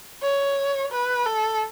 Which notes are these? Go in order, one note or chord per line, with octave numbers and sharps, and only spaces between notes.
C#5
B4
A4